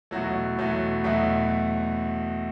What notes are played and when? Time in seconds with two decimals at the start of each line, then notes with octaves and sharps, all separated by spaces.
0.11 E2 B2 F#3 A3 F#4
0.58 E2 B2 F#3 A3
1.04 E2 B2 F#3 A3 E5